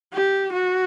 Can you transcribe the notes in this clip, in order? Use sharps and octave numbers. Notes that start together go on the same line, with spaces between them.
G4
F#4